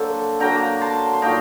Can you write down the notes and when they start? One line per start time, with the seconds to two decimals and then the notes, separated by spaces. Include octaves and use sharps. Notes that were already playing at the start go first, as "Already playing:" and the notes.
Already playing: D3 F#3 A#3 A4 C5
0.40 D3 F#3 A#3 G5 A#5
0.81 A5 C6
1.13 C6
1.22 A#2 F#3 A#3 D#4 G5 A#5